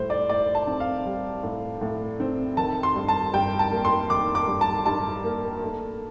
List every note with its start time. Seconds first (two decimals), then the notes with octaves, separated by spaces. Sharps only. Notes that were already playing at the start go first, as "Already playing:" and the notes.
Already playing: A2 G3 C5
0.10 D5
0.29 A2 D5
0.55 A5
0.67 C4
0.80 F5
1.05 G3
1.43 A2
1.81 A2
2.20 C4
2.57 D#3 A5
2.83 C6
2.96 G2
3.08 A5
3.33 G2 G5
3.59 A5
3.71 A#3
3.85 C6
4.10 D#3 D6
4.35 D6
4.47 G2
4.61 A5
4.86 G2 A5
5.24 A#3
5.62 A3